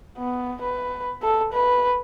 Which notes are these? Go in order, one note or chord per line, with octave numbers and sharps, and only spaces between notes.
B3
B4
A4
B4